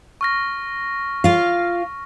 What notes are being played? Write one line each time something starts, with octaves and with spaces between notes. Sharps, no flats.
C#6 F6 A#6
F4 F5